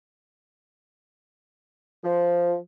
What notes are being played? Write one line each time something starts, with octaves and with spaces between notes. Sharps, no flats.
F3